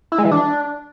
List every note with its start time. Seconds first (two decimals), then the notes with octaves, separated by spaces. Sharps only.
0.12 E4
0.18 G#3
0.25 E3
0.32 D4